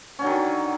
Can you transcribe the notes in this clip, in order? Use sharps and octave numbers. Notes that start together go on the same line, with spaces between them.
D3 D#3 F#3 C#4